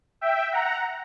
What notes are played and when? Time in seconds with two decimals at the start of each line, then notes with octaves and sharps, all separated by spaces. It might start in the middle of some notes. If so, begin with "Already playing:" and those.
0.21 E5 G5
0.52 F#5 A#5